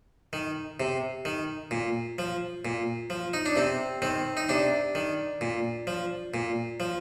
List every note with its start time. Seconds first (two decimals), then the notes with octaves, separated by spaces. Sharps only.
0.33 D#3
0.80 C3
1.25 D#3
1.71 A#2
2.19 F3
2.65 A#2
3.10 F3
3.34 D#4
3.46 D4
3.56 C3 C4
4.02 D#3 C4
4.37 D#4
4.49 C3 D4
4.95 D#3
5.41 A#2
5.87 F3
6.34 A#2
6.80 F3